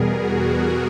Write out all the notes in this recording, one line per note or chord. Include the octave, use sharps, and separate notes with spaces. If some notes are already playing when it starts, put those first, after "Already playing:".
Already playing: E2 B2 G3 B3 G#4 A#4
F#4 G#4